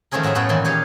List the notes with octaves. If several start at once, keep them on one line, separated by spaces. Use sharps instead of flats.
D#3 F3 A3 C#4 G#4 A#4
A2 F#4 G#4 E5 A#5
F#2 A2 B3 F#4 A4 G5
A#2 D#3 E3
G4 G#4 C#5 F5